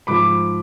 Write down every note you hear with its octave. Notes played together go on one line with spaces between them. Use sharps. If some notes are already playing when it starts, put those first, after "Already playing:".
G#2 F3 B5 D6